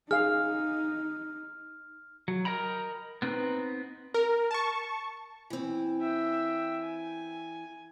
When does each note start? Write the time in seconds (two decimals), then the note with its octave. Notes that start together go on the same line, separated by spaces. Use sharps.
0.11 D#4 G#4 F5 F6
2.28 F#3
2.45 A#4 D#5 G5 A#5 B5
3.22 B3 C4 D#4 B4
4.14 A#4
4.51 A5 C#6
5.50 E3 C4
6.01 E5 G5
6.82 G#5